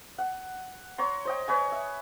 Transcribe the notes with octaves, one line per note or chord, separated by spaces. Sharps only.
F#5
C#5 A#5 C6
C5 D#5 G5
B4 C#5 G#5
E5